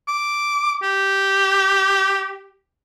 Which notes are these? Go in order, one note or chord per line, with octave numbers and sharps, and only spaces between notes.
D6
G4